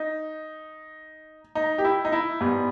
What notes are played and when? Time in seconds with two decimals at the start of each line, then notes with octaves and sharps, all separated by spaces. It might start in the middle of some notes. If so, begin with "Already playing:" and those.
Already playing: D#4
1.55 D#4
1.78 G4
1.84 E4
2.05 D#4
2.12 E4
2.41 G#2 G3 B3